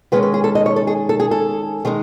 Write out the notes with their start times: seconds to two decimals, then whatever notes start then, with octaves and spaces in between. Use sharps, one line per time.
0.12 D#3 G#3 C#4 B4
0.23 B4
0.34 G#4
0.44 A4
0.55 D#5
0.66 C#5
0.76 A4
0.87 G#4
1.09 A4
1.20 G#4
1.31 A4
1.85 D#3 G#3 D#4